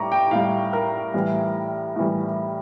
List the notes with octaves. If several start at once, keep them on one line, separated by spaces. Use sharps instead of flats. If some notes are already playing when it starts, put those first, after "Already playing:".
Already playing: A2 G3 A#5 C#6 D6
G5
A2 G3 F5
A#4
A2 E3 G3
A2 E3 G3